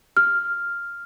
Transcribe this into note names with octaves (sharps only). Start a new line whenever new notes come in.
F6